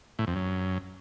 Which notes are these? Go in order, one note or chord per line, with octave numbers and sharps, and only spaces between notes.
A2
F2
F#2